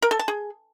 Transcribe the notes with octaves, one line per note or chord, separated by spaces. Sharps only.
A#4
A4
A5
G#4